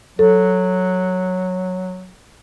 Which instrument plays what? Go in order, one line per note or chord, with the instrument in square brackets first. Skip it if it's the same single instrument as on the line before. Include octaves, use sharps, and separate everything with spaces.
[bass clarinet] F#3 [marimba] A4